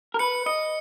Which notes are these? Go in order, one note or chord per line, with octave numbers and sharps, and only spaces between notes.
A#4
B4 C#7
D#5 C#7